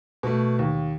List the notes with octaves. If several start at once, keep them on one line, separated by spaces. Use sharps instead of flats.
B2 A3
D#2